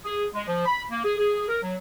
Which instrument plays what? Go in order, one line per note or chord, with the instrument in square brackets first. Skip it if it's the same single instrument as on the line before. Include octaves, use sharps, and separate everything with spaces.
[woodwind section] G#4
G#3
F3
B5
A#3
G#4
G#4
A#4
F#3